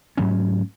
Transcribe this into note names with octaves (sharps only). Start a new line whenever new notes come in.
G#2 F#3 A3 C#4